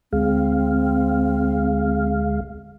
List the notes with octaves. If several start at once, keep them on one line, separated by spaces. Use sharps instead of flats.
D2 G#3 C4 F5